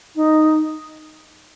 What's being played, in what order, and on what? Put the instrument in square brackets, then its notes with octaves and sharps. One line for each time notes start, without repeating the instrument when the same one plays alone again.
[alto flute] D#4